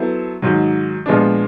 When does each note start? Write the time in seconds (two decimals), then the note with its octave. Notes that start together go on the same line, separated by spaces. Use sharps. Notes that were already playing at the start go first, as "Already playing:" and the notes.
Already playing: F#3 B3 E4 A4 C5
0.42 G#2 D#3 F#3
1.06 A#2 F3 G#3 B3 D4